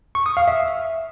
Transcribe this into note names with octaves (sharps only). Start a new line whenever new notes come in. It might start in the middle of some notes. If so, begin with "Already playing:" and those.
C#6
D#6
F5
E5